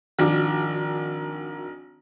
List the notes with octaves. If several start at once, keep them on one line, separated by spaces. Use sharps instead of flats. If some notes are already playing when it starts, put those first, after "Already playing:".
G#1 D#3 F3 D4 F#4